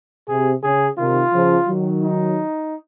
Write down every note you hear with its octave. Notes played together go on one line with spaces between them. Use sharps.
C3 G#4
C#3 G#4
C3 D#3 F4
C#3 F3
D#3 F#3
D#4